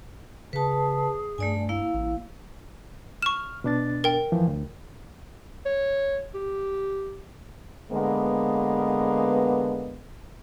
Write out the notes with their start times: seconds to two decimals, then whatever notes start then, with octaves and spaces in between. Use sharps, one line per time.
0.53 C#3 G#4 B4 A5
1.38 G2 A3 D5 G#5
1.69 A#3 E4 F5
1.94 A1
3.22 C#6 F6 E7
3.64 B2 D4 A6
4.04 A#4 G5
4.32 F2 E3 F3
4.48 D2
5.66 C#5
6.35 G4
7.91 D3 G#3 A#3 B3